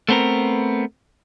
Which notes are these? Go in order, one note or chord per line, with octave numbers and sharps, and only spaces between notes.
A3 B3 C4 A4 A#4